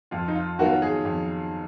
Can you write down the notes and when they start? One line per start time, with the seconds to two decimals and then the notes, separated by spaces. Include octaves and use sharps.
0.11 F2 F4
0.28 D#4
0.35 F4
0.59 D#3 F#3 B3 F4 F#4
0.82 G#4
1.05 F2